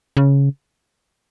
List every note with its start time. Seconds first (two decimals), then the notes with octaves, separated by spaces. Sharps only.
0.17 C#3